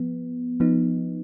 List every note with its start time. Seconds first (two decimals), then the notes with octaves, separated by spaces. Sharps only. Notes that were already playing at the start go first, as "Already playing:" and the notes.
Already playing: F3 B3
0.60 F3 B3 D#4